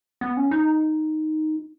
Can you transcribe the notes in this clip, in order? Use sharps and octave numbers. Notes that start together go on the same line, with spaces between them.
B3
C#4
D#4